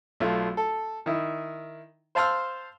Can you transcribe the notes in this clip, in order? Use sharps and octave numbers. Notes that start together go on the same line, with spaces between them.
B1 A3 F4
A4
D#3 E4
C5 F5 A5 C6 E6 F6